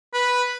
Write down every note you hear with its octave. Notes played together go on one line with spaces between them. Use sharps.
B4